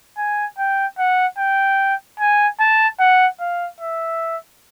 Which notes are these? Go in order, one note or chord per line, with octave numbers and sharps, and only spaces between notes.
G#5
G5
F#5
G5
G#5
A5
F#5
F5
E5